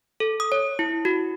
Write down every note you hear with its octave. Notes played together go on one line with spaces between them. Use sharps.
A4
D#6
C#5
E4
F#4